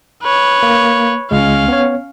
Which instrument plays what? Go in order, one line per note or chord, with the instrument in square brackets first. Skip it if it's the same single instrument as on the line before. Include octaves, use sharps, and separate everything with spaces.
[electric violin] B4 C#5
[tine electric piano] A#3
[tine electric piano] C#2 G#3 [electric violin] C#4 F5
[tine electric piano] B3 C#5